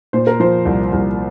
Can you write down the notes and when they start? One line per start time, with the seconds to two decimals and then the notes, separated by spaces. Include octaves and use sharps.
0.13 A#2 C5
0.27 A#4
0.40 F3 C5
0.65 C2
0.92 C2